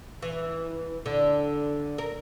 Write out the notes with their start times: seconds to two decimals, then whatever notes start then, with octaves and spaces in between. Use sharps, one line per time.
0.22 E3
1.06 D3
1.98 A#4